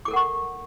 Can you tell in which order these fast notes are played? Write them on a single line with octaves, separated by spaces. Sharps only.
D6 A4 A#4 F#5 C#6